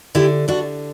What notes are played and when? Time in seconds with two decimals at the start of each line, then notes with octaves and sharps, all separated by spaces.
0.15 D3 E4 G4
0.48 D3 D4 F#4